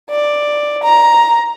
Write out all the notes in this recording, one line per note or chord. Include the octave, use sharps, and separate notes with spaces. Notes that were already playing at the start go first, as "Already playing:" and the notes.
D5
A#5